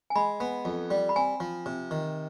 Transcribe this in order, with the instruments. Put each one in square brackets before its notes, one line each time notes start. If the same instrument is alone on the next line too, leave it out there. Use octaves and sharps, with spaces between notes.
[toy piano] G#5
[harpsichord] G#3 [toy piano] B5
[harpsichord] B3
F2
G3
[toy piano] B5
[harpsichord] C4 [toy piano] G#5
[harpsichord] F3
C3
D#3